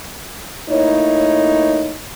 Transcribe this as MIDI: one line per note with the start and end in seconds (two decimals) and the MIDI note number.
0.70 1.94 57
0.70 1.94 58
0.70 1.94 63
0.70 1.94 64
0.70 1.94 73